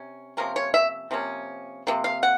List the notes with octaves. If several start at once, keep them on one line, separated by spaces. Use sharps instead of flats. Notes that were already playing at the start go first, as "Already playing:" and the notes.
Already playing: C3 C#4
C3 F3 A#3 C#4 A#4
C#5
E5
C3 F3 A#3 C#4
C3 F3 A#3
F5
F#5